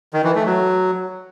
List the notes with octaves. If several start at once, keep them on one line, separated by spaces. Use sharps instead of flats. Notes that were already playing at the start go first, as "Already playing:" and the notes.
D#3
E3
A3
F#3